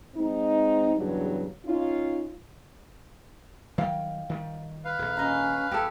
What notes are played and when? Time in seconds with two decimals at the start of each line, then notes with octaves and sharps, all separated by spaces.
0.15 G#3 C4 D#4
0.96 E2 G2 C#3 F#3
1.66 C#4 D#4 F4
3.78 D#3 F#3 G3 F5 G5
4.29 D#3 F3 G3
4.85 B4 F5
4.99 D#1 A#1
5.17 C#4 D#5 A#5
5.71 E2 G4 A4